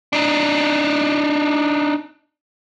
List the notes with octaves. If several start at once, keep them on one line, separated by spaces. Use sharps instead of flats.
D4 D#4